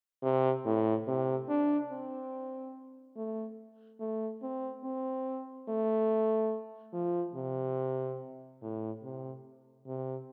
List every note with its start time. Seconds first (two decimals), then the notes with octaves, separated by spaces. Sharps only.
0.23 C3
0.66 A2
1.07 C3
1.49 D4
1.91 C4
3.17 A3
4.00 A3
4.43 C4
4.84 C4
5.69 A3
6.93 F3
7.35 C3
8.62 A2
9.03 C3
9.86 C3